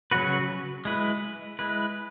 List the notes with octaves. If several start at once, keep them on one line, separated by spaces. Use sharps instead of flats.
C#3 F#3 C#4 F#4 B4
G#3 E4 B4
G#3 E4 B4